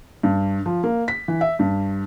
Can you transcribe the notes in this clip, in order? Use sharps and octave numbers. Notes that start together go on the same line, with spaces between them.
G2
F3
A#3
B6
E3
E5
G2